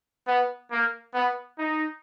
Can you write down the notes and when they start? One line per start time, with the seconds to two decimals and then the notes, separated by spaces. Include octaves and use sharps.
0.28 B3
0.72 A#3
1.15 B3
1.59 D#4